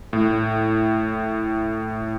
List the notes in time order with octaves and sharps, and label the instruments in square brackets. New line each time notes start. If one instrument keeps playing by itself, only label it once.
[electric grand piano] A2